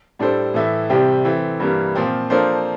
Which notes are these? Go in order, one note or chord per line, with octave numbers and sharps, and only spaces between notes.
A2 G3 D4 A4 C5
A2 E3 A3 E4
C2 C3 G3 C4 G4
E3 A3 C4
G2 E3 G3 A#3
A#2 F3 C4
F3 A#3 D4 A4 C5